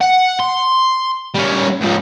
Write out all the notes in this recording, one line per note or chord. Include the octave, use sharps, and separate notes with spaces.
F#5
C6
G3 C#4
C#2 F3